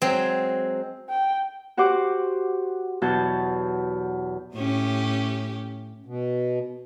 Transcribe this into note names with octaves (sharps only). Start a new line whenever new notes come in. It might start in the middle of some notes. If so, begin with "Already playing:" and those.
F#3 G#3 C4
G5
F#4 G4 C5 F#5 D6
E2 B2 F#3 F#4 A5 G6
A2 C#4 G4
B2